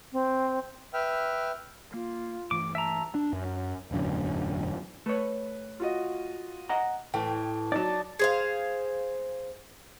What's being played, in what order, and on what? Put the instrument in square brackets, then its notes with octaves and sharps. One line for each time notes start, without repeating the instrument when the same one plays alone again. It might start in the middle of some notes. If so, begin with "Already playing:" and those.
[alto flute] C4
[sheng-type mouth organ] B4 E5 G5 F6
[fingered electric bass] A#3 [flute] F4
[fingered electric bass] G2 E3 A3 [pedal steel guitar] D6
[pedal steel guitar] E5 A#5 [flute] A5
[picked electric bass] D4
F#2
E1 A1 F#2 D3
[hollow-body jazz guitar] A3 C#5 [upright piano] B4
[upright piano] F4 F#4 D#5
[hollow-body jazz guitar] D#5 F#5 A#5
[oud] A2 E3 [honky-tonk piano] G5
[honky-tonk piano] F#3 D#4 [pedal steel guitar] D5 A5
[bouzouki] G#4 C5 F5